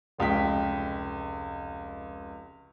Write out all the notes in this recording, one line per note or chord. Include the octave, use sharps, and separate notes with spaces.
F1 C#2 G5 B6